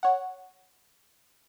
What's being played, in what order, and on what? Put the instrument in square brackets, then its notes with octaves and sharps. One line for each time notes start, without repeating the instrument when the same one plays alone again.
[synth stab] C#5 F#5